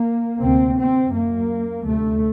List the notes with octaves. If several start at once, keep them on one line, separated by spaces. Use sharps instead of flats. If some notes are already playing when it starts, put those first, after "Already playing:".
Already playing: A#3
D2 C3 C4
C4
F#2 A#3
D2 C3 A3